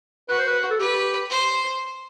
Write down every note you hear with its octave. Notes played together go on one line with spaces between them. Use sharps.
F#4 B4
C5
B4
A4
G4 B4
C5